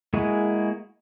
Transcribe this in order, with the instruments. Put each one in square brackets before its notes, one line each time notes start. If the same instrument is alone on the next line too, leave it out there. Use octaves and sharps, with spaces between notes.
[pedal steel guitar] G#3 A#3 E4 F#4 G#4